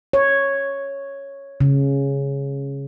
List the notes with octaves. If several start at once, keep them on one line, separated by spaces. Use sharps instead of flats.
C#5
C#3